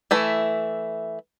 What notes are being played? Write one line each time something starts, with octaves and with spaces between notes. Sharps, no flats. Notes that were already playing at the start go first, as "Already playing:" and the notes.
E3 A3 E4